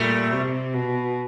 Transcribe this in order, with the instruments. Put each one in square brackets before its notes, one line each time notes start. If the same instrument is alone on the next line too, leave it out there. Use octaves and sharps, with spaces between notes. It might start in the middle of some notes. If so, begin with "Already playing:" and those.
Already playing: [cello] A#2 [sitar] G3 A3
[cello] C3
B2